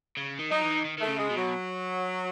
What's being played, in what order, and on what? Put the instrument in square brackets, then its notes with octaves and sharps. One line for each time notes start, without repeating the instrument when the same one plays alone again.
[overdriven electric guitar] C#3
D#3
[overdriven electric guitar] F#3 [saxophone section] D#4
[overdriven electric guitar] E3
D#3
[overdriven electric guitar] D#3 [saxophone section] A3
[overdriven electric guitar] C#3
[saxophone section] G#3
[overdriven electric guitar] B2
[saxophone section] F#3